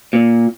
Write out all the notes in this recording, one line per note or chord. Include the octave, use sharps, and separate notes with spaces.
A#2